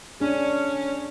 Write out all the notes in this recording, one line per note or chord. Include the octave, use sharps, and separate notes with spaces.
C#4 D4 G#4